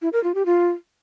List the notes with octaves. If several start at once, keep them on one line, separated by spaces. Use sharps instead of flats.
E4
A#4
F4
G4
F4